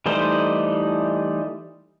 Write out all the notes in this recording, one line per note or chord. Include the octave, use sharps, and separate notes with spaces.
E3 G3 A3 D#4 C5